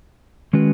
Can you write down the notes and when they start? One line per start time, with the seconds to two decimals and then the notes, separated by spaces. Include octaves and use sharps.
0.53 D#3 G#3 C#4 F#4 B4